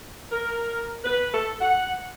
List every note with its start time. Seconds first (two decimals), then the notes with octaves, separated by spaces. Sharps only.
0.32 A#4
1.04 B4
1.34 A4
1.61 F#5